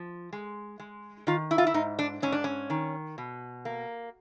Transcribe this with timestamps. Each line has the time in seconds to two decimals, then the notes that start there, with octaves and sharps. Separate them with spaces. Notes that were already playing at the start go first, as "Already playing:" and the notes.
Already playing: F3
0.33 G#3
0.79 G#3
1.27 D#3 F4
1.51 E4
1.58 F4
1.67 E4
1.74 G#2 D#4
1.99 D4
2.22 G#2 C#4
2.32 D4
2.44 C#4
2.70 D#3
3.18 B2
3.65 A#3